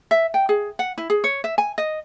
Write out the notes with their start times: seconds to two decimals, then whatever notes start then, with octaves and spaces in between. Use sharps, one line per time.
0.11 E5
0.34 G5
0.49 G#4
0.79 F#5
0.98 E4
1.10 G#4
1.24 C#5
1.44 E5
1.58 G#5
1.78 D#5